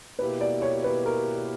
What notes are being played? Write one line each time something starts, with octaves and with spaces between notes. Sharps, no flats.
B2 A#3 E4 G4 B4
D5
C#5
B4
A#4